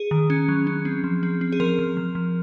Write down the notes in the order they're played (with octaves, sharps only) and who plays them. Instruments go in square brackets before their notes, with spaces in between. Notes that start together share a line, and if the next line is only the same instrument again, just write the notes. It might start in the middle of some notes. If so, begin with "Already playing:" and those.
Already playing: [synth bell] G#4
D#3
C#4
F#3
C#4
C4
F3
C4
C4
G#4
F3 A#4
F3
F3
F3